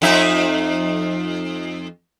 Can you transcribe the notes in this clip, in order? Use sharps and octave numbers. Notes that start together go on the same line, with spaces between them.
F2 D#4 E5